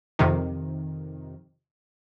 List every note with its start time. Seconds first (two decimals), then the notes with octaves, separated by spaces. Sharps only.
0.19 F2 C3 D#3